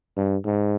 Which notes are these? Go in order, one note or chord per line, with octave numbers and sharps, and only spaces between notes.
G2
G#2